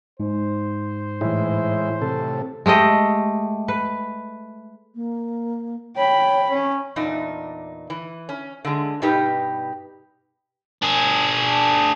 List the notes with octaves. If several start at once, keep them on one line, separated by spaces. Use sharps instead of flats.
G#2 C5
A2 E3 G#3 E4
C3 A4
G#3 A3 G4 D#5
B4
A#3
C#5 G5 B5
C#4 C#5
E2 A#2 D4 D#4
E3
C#4
D3 G#3
G2 B2 D#4 G4 B4
D4 G#4